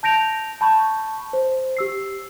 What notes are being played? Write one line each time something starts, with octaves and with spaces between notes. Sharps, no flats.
A5 G6 A#6 D7 F7
A5 B5 C#6 G6
C5
G4 E6 C7